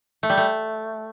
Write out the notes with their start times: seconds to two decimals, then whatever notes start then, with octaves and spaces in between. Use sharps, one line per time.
0.23 A3
0.30 G3
0.37 A3